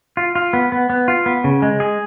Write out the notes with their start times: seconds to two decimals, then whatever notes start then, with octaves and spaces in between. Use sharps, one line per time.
0.17 F4
0.35 F4
0.53 B3
0.72 B3
0.90 B3
1.08 F4
1.26 B3
1.44 C#3
1.62 G#3
1.80 G#4